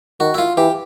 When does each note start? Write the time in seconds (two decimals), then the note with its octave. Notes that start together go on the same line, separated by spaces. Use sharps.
0.20 D#3 F#4
0.34 E4
0.38 F4
0.57 E3 G4